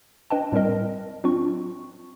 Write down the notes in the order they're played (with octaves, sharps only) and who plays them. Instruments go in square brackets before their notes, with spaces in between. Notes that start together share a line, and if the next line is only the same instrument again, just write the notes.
[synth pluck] D4 B4 D#5 G5 A5
A2 G3 C4 A#4 D#5
F#3 C4 D4 F4 C#6